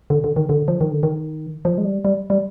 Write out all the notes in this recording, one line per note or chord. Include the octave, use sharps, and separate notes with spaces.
D3
D3
D#3
D3
F3
D#3
D3
D#3
F3
G#3
G3
G3
G3